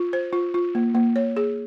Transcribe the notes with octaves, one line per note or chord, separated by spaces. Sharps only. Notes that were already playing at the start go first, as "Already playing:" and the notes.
Already playing: F4
C5
F4
F4
A#3
A#3
C#5
G#4